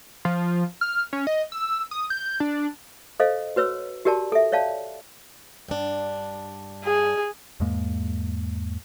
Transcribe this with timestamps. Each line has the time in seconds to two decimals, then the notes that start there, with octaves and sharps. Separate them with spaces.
0.25 F3
0.81 F6
1.13 C#4
1.27 D#5
1.52 E6
1.91 D#6
2.10 G6
2.40 D4
3.20 A4 C5 D#5 F5
3.56 F#4 B4 C#5 E6
4.05 F#4 G4 A#4 D5 A5
4.32 A4 E5
4.52 C#5 D5 F5 A5
5.68 G2 D4
6.84 G#4
7.60 E2 G#2 G#3 A#3